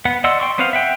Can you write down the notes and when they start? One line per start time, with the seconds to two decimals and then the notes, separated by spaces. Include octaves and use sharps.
0.05 B3 F#5
0.24 D5 D#5 F#5 C6 E6
0.40 G5 C6 C#6
0.58 B3 C4 B4 C5 F5
0.73 E5 F#5 G5